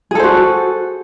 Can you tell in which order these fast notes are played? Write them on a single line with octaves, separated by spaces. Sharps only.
G#4 A4 C5 F#4